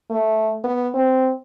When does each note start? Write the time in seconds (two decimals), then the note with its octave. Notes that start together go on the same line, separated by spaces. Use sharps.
0.10 A3
0.64 B3
0.94 C4